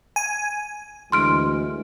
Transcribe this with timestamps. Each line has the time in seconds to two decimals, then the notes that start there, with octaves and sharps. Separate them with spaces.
0.16 G#5
1.12 D2 E3 G#3 C6 F6 D7